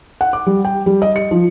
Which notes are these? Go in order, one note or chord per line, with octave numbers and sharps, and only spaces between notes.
F#5
D6
G3
G5
G3
D#5
C#7
F3